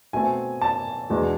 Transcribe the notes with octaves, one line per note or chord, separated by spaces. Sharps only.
B2 A3 C4 G#5
A5
E2 B2 G#3 D4